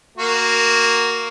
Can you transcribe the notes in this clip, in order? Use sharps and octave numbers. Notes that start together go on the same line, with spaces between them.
A#3 F#4